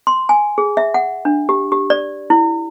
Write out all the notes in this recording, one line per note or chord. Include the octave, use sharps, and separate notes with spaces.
C6
G#5
G#4
E5
F#5
D4
G4
G4
D5
E4